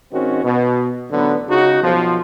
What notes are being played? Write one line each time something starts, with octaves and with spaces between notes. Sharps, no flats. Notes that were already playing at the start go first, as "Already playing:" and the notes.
G#1 D#3 C4 C#4 F#4
B2
A1 D3 F#3 B3
C#2 C#3 D#4 F#4
B1 F3